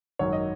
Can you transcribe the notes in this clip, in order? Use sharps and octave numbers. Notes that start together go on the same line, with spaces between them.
G#1 F#2 D#3 F#3 C#5
D#5